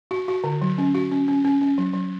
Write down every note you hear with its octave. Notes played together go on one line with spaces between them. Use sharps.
F#4
F#4
D3
F#3
C#4
F#4
C#4
C#4
C#4
C#4
F#3
F#3